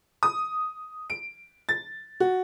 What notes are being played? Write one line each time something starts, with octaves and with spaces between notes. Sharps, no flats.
D#6
D7
A6
F#4